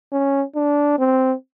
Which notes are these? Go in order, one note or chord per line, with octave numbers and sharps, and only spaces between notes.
C#4
D4
C4